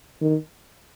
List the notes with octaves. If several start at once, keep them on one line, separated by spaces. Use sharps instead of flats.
D#3